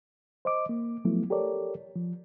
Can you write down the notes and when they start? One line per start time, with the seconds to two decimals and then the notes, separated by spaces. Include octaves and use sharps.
0.45 C5 D#5 D6
0.69 A#3
1.05 F3 F#3 A3 B3 E4
1.30 G4 A4 A#4 C#5 D5
1.96 F3